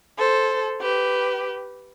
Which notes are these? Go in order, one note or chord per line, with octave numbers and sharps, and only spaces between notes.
A4 C5
G4 B4